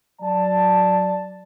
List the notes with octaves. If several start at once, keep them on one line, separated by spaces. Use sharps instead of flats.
F#3 D5 A5